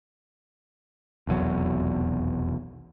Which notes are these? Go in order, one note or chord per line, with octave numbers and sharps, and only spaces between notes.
F1 B1 E2 F#3